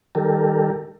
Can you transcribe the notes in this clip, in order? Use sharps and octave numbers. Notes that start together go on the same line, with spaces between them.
D#3 G3 G4 A4 A#4